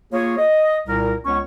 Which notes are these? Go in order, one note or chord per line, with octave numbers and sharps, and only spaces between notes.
A#3 F4 G#4 C#5
D#5
C2 A#2 A#4
C#2 B3 C#4 C#5 C#6